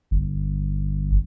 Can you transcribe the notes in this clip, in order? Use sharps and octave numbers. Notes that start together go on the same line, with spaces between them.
G1